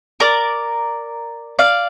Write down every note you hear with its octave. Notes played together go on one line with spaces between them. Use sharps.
A#4 D5
D5 F5